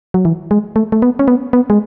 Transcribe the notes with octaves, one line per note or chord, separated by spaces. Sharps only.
F#3
E3
G#3
A3
A3
B3
C#4
B3
B3
G#3